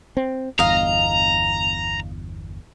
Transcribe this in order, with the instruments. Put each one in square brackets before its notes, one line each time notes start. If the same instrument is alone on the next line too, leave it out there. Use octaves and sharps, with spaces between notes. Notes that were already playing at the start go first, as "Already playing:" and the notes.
[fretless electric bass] C4
[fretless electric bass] G1 E2 [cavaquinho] D#5 F5 [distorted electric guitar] A#5